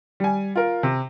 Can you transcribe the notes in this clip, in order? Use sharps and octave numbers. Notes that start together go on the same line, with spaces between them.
G3 G#5
F4 A#4
C3